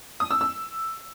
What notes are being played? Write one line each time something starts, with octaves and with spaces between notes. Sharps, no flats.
D#6
E6
E6